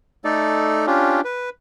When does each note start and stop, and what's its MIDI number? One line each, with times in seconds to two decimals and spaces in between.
0.25 0.86 57
0.25 0.86 63
0.25 0.86 69
0.25 0.86 74
0.87 1.21 61
0.87 1.21 62
0.87 1.21 65
0.87 1.21 67
1.24 1.50 71